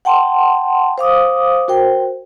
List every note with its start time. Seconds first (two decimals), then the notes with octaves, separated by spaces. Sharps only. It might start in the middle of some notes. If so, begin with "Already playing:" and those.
0.05 F#5 G5 A5 C6
0.98 C5 F5 D6 D#6
1.68 F#4 A#4 C5 G5